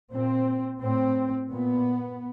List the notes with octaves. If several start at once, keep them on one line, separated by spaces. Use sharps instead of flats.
A#2 C4
A2 C4
A#2 B3